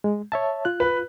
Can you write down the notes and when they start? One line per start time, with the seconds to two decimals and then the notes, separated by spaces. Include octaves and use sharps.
0.04 G#3
0.32 C#5 E5 A5
0.65 F4 F#6
0.80 B4